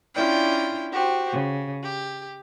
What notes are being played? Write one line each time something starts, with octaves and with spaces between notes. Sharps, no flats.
C#4 D4 E4 F4 D5 G5
F#4 G4 C5
C#3
G4